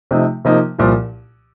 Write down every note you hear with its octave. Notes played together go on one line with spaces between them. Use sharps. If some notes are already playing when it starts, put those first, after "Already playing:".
C3 F3 A3 D#4
C3 F3 A#3 D#4
C2 A#2 F3